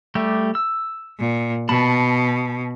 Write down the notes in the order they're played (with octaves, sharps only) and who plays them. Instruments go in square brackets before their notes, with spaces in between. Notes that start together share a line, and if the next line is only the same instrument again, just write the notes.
[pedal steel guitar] G3 A3 G4
E6
[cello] A#2
[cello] B2 [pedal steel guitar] A5 B5